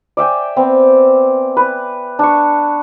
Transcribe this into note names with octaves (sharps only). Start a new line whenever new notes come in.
D5 E5 G5 G#5
B3 C4
B4
D4 C#6